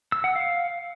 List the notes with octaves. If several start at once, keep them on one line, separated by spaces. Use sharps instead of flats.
E6
F#5
F5